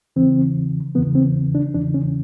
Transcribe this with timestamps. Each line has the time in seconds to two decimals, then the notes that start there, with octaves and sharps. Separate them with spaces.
0.16 E2 C#3 E3 C4
0.95 E2 C#3 E3 B3
1.15 C4
1.55 D4
1.74 E2 C#3 E3 D4
1.94 C#4